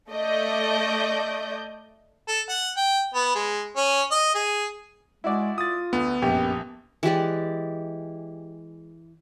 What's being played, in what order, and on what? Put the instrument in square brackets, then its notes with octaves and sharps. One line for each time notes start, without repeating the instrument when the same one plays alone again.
[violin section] A3 D5 D#5 G6
[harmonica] A4
F#5
G5
B3
G#3
C#4
D#5
G#4
[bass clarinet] G#3 [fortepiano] E4 F#4 D5
[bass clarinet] F4 [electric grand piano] D#6 A6
[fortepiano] D2 [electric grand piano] B3
[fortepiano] A#1 [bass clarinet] F#2 [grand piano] G4
[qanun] E3 G#3 G4 D5